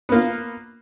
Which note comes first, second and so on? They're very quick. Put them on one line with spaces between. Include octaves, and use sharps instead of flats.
B3 A#3 F4